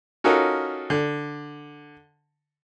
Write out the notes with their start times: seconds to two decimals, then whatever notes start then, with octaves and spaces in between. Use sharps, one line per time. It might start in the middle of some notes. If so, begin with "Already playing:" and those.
0.24 C#4 D#4 F4 F#4 A4 A#4
0.90 D3